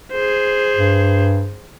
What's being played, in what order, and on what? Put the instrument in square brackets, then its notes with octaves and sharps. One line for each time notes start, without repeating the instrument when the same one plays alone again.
[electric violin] G#4 C5
[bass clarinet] G2